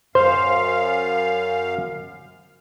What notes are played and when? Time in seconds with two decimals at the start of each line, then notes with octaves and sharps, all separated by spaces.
0.15 F#2 C5 F5